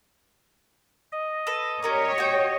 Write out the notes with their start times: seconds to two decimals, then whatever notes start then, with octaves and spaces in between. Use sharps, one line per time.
1.12 D#5
1.47 A4 B4
1.82 C#4 G4 A#4 C#5 D5
2.18 F#4 G5